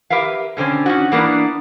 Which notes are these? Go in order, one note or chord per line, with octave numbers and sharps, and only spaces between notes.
G4 A#4 B4 E5 F5
B2 D3 C4 C#4
C#4 D#4 F#4
E3 A#3 B3 D4